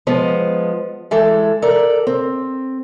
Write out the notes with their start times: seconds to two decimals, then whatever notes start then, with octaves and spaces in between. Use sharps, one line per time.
0.07 F3 G#3 B3
1.11 E3 G#3 A4
1.62 A4 A#4 D5
2.07 C4